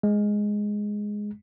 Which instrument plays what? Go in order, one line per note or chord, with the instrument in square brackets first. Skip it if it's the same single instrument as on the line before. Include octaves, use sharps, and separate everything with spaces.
[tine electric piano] G#3